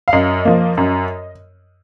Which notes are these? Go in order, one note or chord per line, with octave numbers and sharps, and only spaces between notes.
F5
F#2 D#5
F3 A#3
F#2